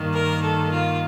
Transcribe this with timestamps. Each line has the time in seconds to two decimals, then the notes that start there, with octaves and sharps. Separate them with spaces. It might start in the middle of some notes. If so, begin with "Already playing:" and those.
Already playing: G2 D#3 A#3
0.13 A#4
0.42 A4
0.71 F4